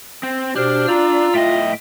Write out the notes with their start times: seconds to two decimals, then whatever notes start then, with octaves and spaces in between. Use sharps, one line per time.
0.23 C4
0.56 B2 D4 G4 C5 F6
0.88 F4 D5 A#5 E6
1.35 A2 D#5 E5 G5